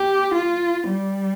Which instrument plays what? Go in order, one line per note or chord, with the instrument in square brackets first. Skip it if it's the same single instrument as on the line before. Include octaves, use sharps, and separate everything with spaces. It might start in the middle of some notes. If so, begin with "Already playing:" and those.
Already playing: [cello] G4
F4
G3